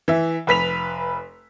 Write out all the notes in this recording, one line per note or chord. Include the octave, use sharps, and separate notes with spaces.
E3 E5
F1 B4 B6 F7